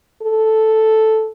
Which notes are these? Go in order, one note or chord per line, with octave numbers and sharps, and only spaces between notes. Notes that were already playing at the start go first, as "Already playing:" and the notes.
A4